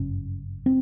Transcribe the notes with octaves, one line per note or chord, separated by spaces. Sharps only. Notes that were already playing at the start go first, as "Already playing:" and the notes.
Already playing: G1 F#2 C#3 C#4
C4